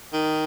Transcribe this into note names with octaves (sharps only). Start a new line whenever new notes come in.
D#3